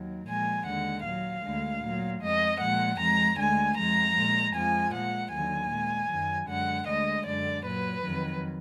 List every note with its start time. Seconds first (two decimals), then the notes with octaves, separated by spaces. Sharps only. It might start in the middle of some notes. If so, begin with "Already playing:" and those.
Already playing: D#2 D#3 F#3
0.28 A#2 F3 G#3 G#5
0.66 D#2 D3 G#3 F#5
1.05 A#2 F#3 F5
1.44 D2 D3 G#3
1.83 A#2 F#3
2.22 F2 F3 G#3 D#5
2.60 A#2 F3 G#3 F#5
2.99 F2 F3 G#3 A#5
3.38 D2 D3 G#3 G#5
3.77 F2 F3 G#3 A#5
4.16 A#2 G#3
4.55 F2 F3 G#3 G#5
4.93 A#2 G#3 F#5
5.32 D#2 D3 F#3 G#5
5.71 A#2 G#3
6.11 F#2 D#3 F#3
6.49 F#2 D3 G#3 F#5
6.87 D2 D3 G#3 D#5
7.26 F#2 D3 G#3 D5
7.65 A#2 F#3 B4
8.04 F2 D#3 F#3